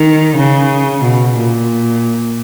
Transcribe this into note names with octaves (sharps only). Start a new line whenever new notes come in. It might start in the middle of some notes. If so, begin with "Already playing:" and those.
Already playing: D#3
C#3
B2
A#2